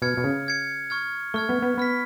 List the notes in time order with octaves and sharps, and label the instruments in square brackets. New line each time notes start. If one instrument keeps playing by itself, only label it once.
[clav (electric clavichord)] B2 [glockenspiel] F6 G#6 C#7
[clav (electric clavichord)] B2
C#3
[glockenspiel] F6 G#6 C#7
C#6 F6 G#6
[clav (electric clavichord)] A3 [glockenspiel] C#6 F6 G#6
[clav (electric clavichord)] B3
B3
[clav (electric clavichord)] B3 [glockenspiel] B5 F6 B6